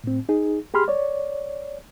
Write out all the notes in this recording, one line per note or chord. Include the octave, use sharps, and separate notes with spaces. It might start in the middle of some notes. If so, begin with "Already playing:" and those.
A2 C4
D#4 G#4
G4 G#4 B5 C6 F6
C#5 D5